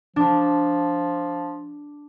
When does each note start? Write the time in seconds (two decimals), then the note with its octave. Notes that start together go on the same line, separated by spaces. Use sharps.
0.16 F3 D4